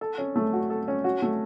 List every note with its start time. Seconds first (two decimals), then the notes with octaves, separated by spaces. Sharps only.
0.01 A4
0.18 C#4
0.36 A3
0.53 F#4
0.70 A4
0.88 C#4
1.04 F#4
1.22 A3